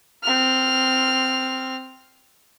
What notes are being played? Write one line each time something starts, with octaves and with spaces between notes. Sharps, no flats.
C4 F6